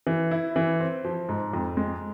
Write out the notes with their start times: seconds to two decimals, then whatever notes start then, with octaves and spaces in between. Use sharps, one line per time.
0.07 E3
0.31 E4
0.56 E3
0.80 C4
1.05 F3
1.29 G#2
1.53 F2
1.77 G#3